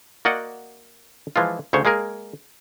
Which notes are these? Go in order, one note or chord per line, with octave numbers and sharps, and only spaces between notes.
A#3 F#4 D5 D#5 F#5
E3 F3 G#3 F4
D2 C#3 C5 C#5
G#3 A#3 G#4 A#4